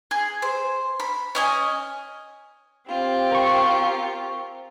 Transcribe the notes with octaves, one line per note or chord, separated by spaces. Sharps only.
G#4
C5
B5
C#4 D#5 G#5
C4 F4 G4
A#4 C#6